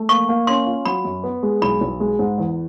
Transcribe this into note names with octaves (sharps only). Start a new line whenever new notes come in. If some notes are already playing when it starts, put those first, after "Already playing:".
Already playing: A3
A#3 C#6
A#3
C#4 C6
F4
F#3 B5
F#2
B3
G#3
B1 B5
B1
G#3
G#2
E2